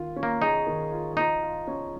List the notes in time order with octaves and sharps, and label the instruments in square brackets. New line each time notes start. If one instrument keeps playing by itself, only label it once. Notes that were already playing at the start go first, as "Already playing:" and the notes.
Already playing: [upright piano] D#3 F4
C#4
[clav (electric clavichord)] A#3
[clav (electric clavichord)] D#4 [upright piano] G#4
[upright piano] D#3
F4
[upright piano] F3 [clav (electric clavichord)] D#4
[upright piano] F4
C#4